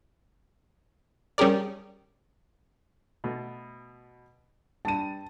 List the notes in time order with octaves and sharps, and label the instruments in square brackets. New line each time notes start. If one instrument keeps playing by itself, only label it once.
[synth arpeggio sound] G3 C#4 G4 G#4 A#4 D5
[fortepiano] B2 A3
[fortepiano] G2 [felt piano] A5 D#7